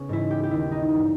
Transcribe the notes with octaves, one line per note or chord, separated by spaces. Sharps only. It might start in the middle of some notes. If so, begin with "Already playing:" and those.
Already playing: C#3 B3 C#4
G#2 E3 E4
G4
G4
D#2 D#3 E4
D#4
G2 E3